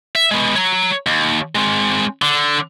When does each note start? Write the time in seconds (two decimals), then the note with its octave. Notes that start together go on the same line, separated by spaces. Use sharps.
0.16 E5
0.31 G#3 B3
0.56 C#5 A#5
1.06 D#2
1.55 G#3 C4
2.22 D3